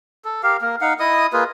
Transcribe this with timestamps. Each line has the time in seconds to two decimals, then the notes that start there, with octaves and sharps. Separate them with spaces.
0.25 A4
0.43 G4 A#4 F5
0.61 A#3 A#4
0.81 D#4 F5 F#5
1.00 E4 D#5 D#6
1.33 A#3 F4 G#4 B4